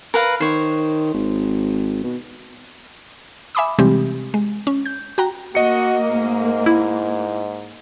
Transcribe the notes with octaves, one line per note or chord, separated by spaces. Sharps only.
A#4 B4 F5
D#3 C5 C#5
G#1
B2
E5 G#5 B5 D6 D#6
C3 E3 G3 G#3 C4 G4
G#3
C#4
G6
F#4 G5 A#5
A#3 F#4 D#5 C#7
G#2
E4